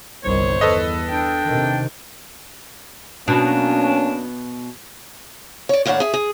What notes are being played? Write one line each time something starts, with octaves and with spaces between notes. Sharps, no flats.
G1 C2 D#3 C5 C#5
E2 A4 B4 D#5
D4 G5
C3 D#3
B2 F#3 A#3 C#4 D4
C#5 D5
D#2 A2 D4 C#5 F#5
G#4 E5
G#4